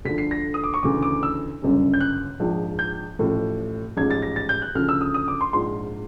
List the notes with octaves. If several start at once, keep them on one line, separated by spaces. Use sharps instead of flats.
D2 D3 F3 B6
C7
A#6
D#6
D6
C#6
D2 C#3 E3 D6
D6
E6
G1 F#2 C#3
G6
F#6
A#1 G#2 F3
G6
A1 A2 F3
A1 G#2 F3 G#6
A6
A#6
A6
G6
F#6
D2 C#3 F3 F6
E6
D#6
D#6
D6
C6
A#1 G#2 F3 C6